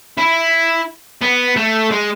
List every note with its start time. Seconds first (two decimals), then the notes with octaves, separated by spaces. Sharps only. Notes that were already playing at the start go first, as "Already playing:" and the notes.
0.18 E4
1.21 B3
1.56 A3
1.91 G#3